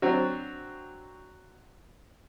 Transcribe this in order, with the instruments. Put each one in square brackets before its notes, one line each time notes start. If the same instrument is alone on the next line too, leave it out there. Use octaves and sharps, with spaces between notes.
[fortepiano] F#3 C4 D4 F#4